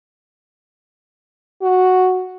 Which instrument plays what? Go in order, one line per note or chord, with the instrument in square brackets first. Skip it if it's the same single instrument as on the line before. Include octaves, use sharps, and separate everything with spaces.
[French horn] F#4